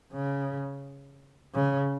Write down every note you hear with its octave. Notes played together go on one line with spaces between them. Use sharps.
C#3
C#3